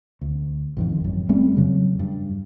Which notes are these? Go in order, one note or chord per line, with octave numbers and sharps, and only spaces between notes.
D2
A1 F2 D#3
G#1 F#2
G3 A3 C4 C#4
F2 C#3 F#3
G2